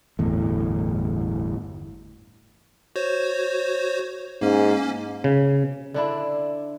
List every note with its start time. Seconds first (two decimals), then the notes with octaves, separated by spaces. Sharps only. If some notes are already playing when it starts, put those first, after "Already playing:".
0.19 G1 E2 A2
2.96 F#4 C5 C#5
4.41 G#2 A#3 C#4
5.24 C#3
5.94 D3 D4 E4